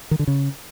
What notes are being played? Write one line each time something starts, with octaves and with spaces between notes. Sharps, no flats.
D#3
D3
C#3